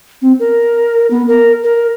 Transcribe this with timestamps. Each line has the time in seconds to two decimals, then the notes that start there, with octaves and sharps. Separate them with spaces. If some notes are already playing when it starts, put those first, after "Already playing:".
0.22 C4
0.39 A#4
1.10 B3
1.28 A#4
1.64 A#4